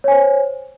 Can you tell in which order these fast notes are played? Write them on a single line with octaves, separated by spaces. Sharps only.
C#5 G#5 C5